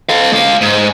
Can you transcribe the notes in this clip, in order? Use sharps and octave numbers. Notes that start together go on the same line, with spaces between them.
A4 F5
G#3 F5
G#2